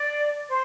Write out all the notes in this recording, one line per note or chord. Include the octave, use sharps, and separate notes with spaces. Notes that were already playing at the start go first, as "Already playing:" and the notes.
Already playing: D5
C5